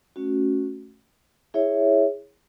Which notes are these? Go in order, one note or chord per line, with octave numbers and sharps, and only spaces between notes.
A3 C#4 F#4
E4 G#4 C#5 E5